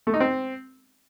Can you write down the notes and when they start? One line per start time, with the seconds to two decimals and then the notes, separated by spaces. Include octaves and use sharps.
0.07 A3
0.14 D#4
0.20 C4